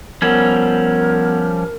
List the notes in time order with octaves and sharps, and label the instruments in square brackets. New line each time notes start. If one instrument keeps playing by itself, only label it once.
[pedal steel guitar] F3 G3 C#4 [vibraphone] B3 F#5 E6 [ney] A#4